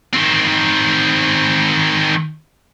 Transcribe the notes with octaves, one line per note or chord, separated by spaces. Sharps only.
D#3 C4